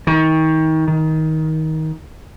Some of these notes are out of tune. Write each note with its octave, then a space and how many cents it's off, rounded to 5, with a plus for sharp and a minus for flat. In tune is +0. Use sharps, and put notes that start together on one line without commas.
D#3 +30
D#3 +20